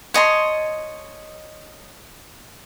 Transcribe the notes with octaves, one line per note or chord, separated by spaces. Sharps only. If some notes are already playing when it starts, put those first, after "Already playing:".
C#5 D#5 A5 C6